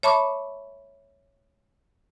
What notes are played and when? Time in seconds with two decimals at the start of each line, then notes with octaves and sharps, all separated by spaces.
0.03 C#5 E5 A5 B5 C#6 D6